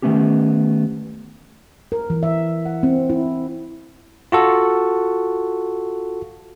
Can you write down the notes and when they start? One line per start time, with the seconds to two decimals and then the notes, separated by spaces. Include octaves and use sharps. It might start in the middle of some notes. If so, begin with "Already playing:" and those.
0.02 D#3 F#3 A3 B3 C#4 G4
1.92 A#4
2.10 E3
2.23 E5
2.66 F#5
2.83 C4
3.10 E4
4.32 F4 F#4 A4